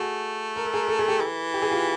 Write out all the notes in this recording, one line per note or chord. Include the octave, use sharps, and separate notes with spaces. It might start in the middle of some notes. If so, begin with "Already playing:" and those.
Already playing: A3 F#4 G#4
A#4
A4
G#4 A#4
A4
G#4
G4 A4
E3
G4
G#4
F4 G4